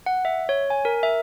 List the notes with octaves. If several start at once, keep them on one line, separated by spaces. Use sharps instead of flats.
F#5
E5
C#5
G#5
A#4
E5